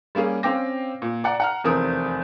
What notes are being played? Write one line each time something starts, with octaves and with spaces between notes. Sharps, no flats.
G3 A#3 C#4 G#4
C4 C#4 F5 G5 D6 A#6
A#2
D5 F#5 A#5
F#5 A#5 F6
F1 E2 C4 A#4 D#6